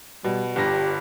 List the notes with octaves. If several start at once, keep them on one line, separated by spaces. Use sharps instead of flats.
B2 G3
G1 G2 G4 A#6